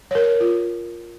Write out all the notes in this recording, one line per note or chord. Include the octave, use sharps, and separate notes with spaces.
A#4 C#5
F4